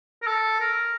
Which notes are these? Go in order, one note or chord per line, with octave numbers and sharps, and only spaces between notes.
A#4
A4
A#4